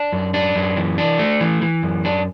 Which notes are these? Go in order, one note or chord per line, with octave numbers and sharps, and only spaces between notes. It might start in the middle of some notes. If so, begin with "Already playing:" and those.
Already playing: D4
F#2
D4
F#2
E3
D4
A3
E3
E3
F#2
D4